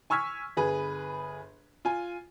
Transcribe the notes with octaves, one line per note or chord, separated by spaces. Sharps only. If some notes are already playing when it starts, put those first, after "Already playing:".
G#5 C#6 E6 F6 G#6 B6
G1 G#4 B4
F4 G#5